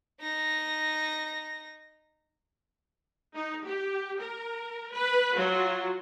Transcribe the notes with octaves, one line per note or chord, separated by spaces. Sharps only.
D#4 A#6
D#4
G4
A#4
B4
F#3 F4 F#4